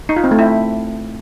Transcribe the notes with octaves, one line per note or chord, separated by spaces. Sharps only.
D#4
F4
C4
A3
E4